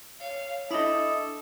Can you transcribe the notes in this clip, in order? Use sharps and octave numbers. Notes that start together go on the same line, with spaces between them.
C#5 F5
D4 E4 A4 D#5 E5 D#6